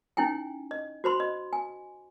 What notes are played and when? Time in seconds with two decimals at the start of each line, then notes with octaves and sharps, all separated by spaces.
0.17 C#4 D#4 E4 G5 G#5
0.71 D#5
1.04 F#4 C5 B5 C6
1.20 D#5
1.53 G#5